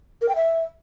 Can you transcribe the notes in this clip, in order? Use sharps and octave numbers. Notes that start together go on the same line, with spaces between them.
A#4
G5
E5